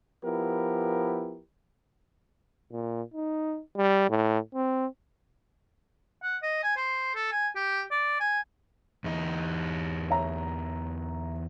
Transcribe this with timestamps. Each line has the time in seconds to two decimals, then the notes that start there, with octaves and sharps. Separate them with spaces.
0.24 F3 B3 E4 G4 A#4
2.72 A#2
3.14 D#4
3.77 G3
4.10 A2
4.54 C4
6.23 F#5
6.43 D#5
6.63 G#5
6.77 C5
7.15 A4
7.32 G#5
7.56 G4
7.91 D5
8.20 G#5
9.04 E2 D#4
10.10 C#5 E5 A#5